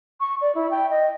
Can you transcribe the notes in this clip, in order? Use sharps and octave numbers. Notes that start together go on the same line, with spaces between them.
C#6
D5
E4
G5
D#5